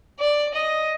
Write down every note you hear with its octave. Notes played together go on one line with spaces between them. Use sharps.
D5
D#5